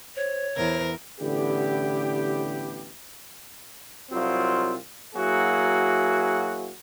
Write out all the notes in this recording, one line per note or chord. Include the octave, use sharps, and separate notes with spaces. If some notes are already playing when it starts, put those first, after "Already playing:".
C5 C#5
E2 A#4 C5
A1 D3 B3 E4 G4
C2 F#3 C4 F4
F#3 A#3 E4 F#4 G#4